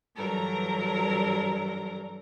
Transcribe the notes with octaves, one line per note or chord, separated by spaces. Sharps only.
G2 E3 F#3 A4 A#4 A#5